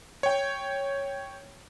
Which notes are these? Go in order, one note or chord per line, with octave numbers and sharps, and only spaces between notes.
C#5 G5